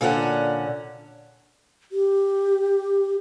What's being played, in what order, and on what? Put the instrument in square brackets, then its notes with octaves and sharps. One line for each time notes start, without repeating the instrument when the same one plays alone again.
[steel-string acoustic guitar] A#2 D3 C#4 F#5
[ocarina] G4